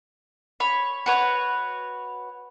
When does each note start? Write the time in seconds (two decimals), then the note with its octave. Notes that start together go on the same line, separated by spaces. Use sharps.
0.60 C#5 B5
1.06 F#4 B4 C#5